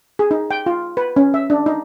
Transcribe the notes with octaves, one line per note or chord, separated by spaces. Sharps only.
G#4
D#4
G5
F4
B4
C#4
E5
D4
D#4